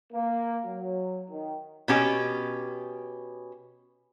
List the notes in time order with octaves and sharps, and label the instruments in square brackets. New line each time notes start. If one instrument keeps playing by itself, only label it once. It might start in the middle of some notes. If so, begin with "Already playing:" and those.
[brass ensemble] A#3
F#3
D#3
[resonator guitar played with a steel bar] B2 C#4 G4